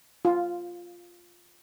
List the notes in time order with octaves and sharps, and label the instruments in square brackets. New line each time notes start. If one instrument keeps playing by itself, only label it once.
[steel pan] F4